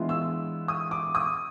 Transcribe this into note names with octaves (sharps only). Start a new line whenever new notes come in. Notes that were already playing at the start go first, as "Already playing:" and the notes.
Already playing: E3 G#3 B3 D4 F4
E6
D#6
D6
D#6